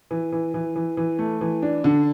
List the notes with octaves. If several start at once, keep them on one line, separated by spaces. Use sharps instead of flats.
E3
E3
E3
E3
E3
A3
E3
D4
D3